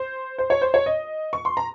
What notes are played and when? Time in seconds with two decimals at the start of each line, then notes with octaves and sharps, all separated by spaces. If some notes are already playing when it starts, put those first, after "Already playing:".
Already playing: C5
0.38 C5
0.50 C#5
0.62 C5
0.74 C#5
0.86 D#5
1.33 C#6
1.45 C6
1.57 A#5